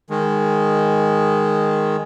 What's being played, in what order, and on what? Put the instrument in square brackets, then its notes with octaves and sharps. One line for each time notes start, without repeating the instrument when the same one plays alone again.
[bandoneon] D#3 G#3